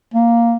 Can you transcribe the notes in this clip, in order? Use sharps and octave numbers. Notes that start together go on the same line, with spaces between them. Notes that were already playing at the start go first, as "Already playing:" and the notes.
A#3